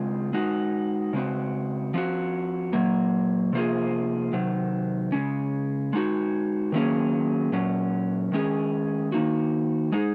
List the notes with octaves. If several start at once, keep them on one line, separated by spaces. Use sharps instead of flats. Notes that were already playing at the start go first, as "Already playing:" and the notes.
Already playing: C#3 G#3 C4 F4
G#3 D#4 F#4
C#3 G#3 C4 F#4
F3 C4 F#4
A#2 F#3 A#3
C3 F3 A#3 F4 G#4
C3 D#3 F#3
C#3 G#3 C#4
G#3 D#4 F#4
D#3 F#3 A#3 C#4 G#4
A#2 F#3 C#4
D#3 G#3 C#4 G#4
D#3 A#3 D#4 F#4
G#3 D#4 G#4